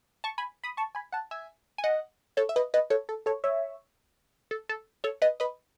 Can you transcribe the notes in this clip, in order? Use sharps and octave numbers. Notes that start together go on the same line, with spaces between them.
A5 C#6
G#5 B5
B5 D#6
A5 C#6
G#5 B5
F#5 A5
E5 G#5
G#5
D#5 F#5
A4 C#5
E5
B4 D#5
B4 D#5
A4 C#5
A4
A4 C#5
C#5 E5
A4
A4
A4 C#5
B4 D#5
B4 D#5